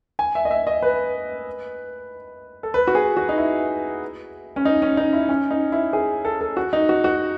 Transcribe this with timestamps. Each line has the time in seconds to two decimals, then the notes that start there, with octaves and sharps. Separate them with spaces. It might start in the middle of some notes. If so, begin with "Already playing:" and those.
0.19 G#5
0.35 E5
0.45 D#5
0.51 E5
0.67 D#5
0.82 B4
2.63 A4
2.74 B4
2.87 F#4
2.95 G#4
3.17 F#4
3.29 D#4
3.38 E4
4.56 C#4
4.65 D#4
4.82 C#4
4.97 D#4
5.13 E4
5.29 C#4
5.51 D#4
5.72 E4
5.93 G#4
6.25 A4
6.41 A4
6.57 F#4
6.73 D#4
6.89 F#4
7.04 F#4